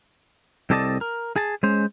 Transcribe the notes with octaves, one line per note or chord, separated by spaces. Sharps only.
C2 C4 A4 D5 D#5 A5
A#4
G#4 A5
G#3 C#4 C5